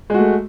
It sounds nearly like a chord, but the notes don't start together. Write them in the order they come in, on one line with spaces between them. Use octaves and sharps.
G#3 F#4 A3